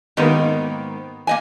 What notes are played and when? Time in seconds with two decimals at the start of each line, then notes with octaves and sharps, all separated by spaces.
0.17 G#2 D#3 A#3 B3 D#4
1.27 A#3 D#5 G#5